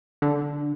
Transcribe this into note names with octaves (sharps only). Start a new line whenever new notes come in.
D3